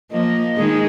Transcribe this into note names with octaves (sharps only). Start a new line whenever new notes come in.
F3 A#3 D#5
D#3 G#3 G#4